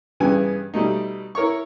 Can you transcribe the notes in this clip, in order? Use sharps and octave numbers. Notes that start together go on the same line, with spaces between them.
G2 C#3 E3 B3 G#5
B2 G3 A3 D#4
E4 A#4 C#5 C#6